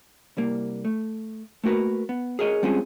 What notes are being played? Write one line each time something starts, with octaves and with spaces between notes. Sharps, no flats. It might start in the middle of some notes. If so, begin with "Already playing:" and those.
C2 G3 A#3
A3
A3 A#3 F#4 A#4 B4
B3
G#4 A#4 C#5 D#5
G3 G#3 C4 C#4 F4 G#4